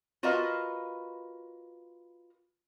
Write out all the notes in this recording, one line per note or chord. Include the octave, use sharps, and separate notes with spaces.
F4 F#4 A#4 B4 D#5 F5